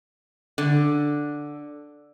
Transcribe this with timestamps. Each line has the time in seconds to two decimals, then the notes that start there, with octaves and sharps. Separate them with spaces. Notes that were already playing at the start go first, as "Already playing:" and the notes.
0.58 D3